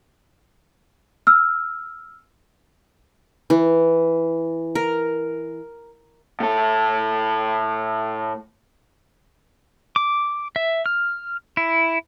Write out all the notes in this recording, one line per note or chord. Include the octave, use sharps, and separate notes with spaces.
E6 F6
E3
A#4
A2 A4
D6
E5
F6
E4